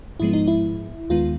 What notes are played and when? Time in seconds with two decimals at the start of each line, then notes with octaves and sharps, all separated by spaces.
0.20 G#2 F3 G#3 B3 E4
0.33 D#4
0.47 E4
1.10 D#2 D#3 G#3 B3 F4